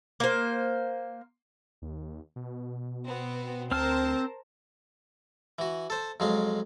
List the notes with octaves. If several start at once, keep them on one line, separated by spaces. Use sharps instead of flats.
A#3 C5
D#2
B2
B3 C4
D2 C4 A#4 C5 A5 F6
E3 F#4
A4 C5
F2 F#3 G#3 F5